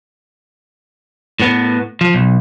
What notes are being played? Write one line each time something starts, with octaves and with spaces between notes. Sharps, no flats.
A2 B3
F3
B1